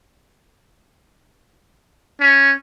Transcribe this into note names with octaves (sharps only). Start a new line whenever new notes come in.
C#4